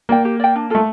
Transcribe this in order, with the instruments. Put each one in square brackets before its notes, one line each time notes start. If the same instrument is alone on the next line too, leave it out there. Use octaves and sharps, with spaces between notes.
[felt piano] A#3 [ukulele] D5 G5
[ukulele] G4
D5 G5
D4
[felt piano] A3 [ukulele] F4 A4